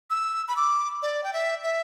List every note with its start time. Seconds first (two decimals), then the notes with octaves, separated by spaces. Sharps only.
0.10 E6
0.48 B5
0.57 D6
1.03 D5
1.24 G5
1.33 E5
1.64 E5